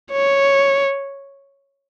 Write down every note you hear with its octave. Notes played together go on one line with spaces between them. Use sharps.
C#5